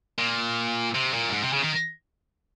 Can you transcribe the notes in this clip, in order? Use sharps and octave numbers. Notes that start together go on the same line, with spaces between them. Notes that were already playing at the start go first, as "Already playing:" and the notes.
A#2
C3
A#2
F#2
G#2
C3
C#3
D#3